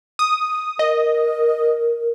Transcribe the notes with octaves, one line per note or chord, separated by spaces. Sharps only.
D#6
A#4 D#5